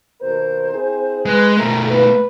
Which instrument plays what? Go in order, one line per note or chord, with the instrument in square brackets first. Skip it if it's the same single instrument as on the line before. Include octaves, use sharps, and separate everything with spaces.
[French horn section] D#2 B2 A#4 [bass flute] C5
[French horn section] C4 E4 G#4
[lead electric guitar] G#3 [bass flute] B4
[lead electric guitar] B2 A3 [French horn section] F3 A4 [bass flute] A#4
[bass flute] A#3 [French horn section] B4